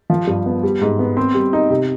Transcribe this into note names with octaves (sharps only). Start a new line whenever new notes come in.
F3
G2
B3
G3
G#2
B3
C4
G3
D#4
C3